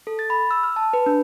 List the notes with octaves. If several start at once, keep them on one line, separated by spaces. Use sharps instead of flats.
A4
A6
B5
E6
F6
A5
B4
D4